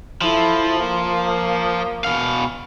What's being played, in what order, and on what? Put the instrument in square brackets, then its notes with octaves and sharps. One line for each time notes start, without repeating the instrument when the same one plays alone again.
[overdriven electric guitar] F3 [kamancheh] E4 A4
[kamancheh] A#3
[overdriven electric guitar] B2 F5